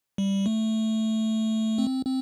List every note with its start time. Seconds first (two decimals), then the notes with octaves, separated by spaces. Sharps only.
0.18 G3
0.46 A3
1.78 C4
2.06 C4